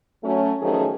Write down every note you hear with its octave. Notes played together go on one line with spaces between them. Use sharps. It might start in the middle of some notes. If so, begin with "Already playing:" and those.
F#3 A3 C#4
D#3 F3 F#3 A3 C#4 G#4